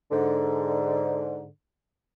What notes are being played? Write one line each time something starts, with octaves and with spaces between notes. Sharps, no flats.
G#2 D3